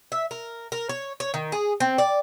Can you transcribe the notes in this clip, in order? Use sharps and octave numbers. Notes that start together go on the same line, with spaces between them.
E5
A#4
A#4
C#5
C#5
D#3
G#4
C4
D5